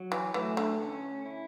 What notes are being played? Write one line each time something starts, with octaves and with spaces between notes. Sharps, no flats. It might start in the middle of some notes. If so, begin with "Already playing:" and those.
Already playing: F#3
E3
E3 A3
D3
C#4
E4